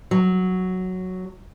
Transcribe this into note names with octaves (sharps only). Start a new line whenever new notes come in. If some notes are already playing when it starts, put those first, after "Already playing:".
F#3